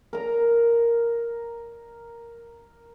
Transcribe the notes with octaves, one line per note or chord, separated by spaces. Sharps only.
A#4 A#5